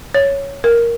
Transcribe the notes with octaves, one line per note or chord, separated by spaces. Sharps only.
C#5
A#4